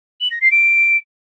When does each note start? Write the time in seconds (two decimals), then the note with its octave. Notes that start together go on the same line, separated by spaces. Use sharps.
0.21 F#7
0.31 A#6
0.41 C7
0.51 D7